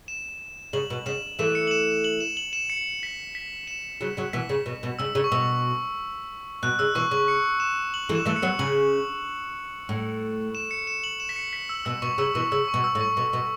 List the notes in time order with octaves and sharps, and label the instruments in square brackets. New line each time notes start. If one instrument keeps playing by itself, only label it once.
[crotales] E7
[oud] C#3 [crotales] F#7
[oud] B2
[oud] C#3 [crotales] E7
[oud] E3 A3 [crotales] E7
[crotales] C#7
F#7
E7
E7
F#7
E7
F#7
E7
C#7
B6
B6
E7
[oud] C#3 F#3
C#3 F#3
[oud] B2 E3 [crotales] B6
[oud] C#3
B2
B2
[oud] C#3 [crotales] E6
[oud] C#3
[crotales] C#6
[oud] B2 [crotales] E6
[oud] B2 [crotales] F#6
[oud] C#3 [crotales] E6
[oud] B2 E3 [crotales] C#6
[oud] C#3 [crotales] C#6
[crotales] C#7
E7
F#7
[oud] E3 A3
[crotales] E7
[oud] E3 A3
[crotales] C#7
[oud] F#3 B3
[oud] C#3 [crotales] F#7
[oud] A2
[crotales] E7
C#7
E7
F#7
E7
B6
C#7
B6
E6
[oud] B2 [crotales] E6
[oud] B2 [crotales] C#6
[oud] C#3 [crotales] E6
[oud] B2 E3 [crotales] C#6
[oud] C#3 [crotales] E6
[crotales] C#6
[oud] B2
[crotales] E6
[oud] A2
[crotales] C#6
[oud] B2
B2